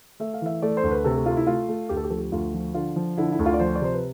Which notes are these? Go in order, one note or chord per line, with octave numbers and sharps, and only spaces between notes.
A3 E5
F5
E3 E5
A3 D5
C5
D2
B4
C3 A4
A4
A3 F4
E4
A3 F4
A3
D2 G4
A4
G4
F3 A4
G4
D2 F4
F3
D3 F4
F3
D3 E4
E4
D2
F4
D5
F3 C5
D5
C3 C5
B4